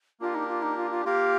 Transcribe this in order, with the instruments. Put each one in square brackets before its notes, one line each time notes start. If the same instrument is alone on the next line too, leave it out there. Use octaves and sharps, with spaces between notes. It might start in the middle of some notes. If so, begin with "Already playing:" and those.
[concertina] A#3 D4 G4 A#4 [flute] F4
[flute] D#4
F4
D#4
F4
F4
[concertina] A#3 F4 A#4 F5 [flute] G4